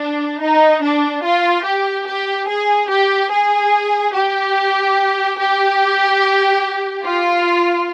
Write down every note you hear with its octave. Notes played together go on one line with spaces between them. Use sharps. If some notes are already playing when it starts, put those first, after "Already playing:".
Already playing: D4
D#4
D4
F4
G4
G4
G#4
G4
G#4
G4
G4
F4